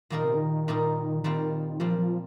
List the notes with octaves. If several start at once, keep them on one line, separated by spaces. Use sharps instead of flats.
A#2 D#3 G3 A#3 D#4 A#4
C3
D#3
A#2 G3 A#3 D#4 A#4
A#2 D#3 G3 C4 F4
A#2 F3 G3 C4 F4
F3